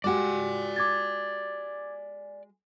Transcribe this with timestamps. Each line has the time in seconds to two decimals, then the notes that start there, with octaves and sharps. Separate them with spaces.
0.04 G#3 F#4 G4 D5 G#5 D6
0.76 D6 G#6 A6